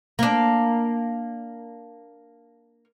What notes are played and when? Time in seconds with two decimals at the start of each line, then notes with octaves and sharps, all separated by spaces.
0.19 A#3 D4